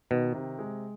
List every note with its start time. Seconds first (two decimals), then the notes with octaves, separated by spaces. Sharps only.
0.11 B2 D#3
0.34 C3
0.59 G#3